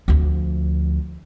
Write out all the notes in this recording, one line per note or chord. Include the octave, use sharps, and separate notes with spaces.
D2 F3